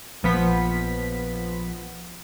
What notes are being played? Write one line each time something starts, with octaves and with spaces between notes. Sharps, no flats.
A#1 F3 B3 B6